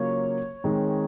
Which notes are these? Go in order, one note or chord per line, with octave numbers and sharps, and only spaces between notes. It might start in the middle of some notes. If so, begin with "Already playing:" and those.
Already playing: C#3 F#3 A#3 F4 C#5
D#3 G#3 C4 D#4